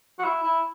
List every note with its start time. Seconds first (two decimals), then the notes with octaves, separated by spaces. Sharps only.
0.19 F#4
0.24 E4
0.44 E4